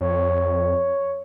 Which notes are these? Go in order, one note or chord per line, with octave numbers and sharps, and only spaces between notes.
F2 C#5